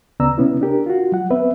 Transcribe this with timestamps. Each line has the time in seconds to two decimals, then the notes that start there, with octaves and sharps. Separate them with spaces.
0.20 D2 C#3 B3 D5 A#5 E6
0.38 C3 B3 C#4 E4
0.61 D4 G4 A#4
0.86 F4 F#4
1.12 F#3 F#5
1.31 B3 C4 B4 E5